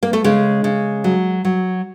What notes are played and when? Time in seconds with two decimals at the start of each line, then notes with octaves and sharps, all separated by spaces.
0.03 A#3
0.13 A3
0.24 C#3 G#3
0.64 C#3
1.04 F#3
1.45 F#3